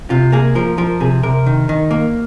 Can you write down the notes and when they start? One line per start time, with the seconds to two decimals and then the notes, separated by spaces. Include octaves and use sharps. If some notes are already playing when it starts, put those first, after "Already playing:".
0.10 C3 F4
0.32 A#3 G#4
0.55 F3 A#4
0.78 F3 A#4
1.00 C3 G#4
1.23 C3 A#4
1.46 D#3
1.69 D#3
1.91 A#3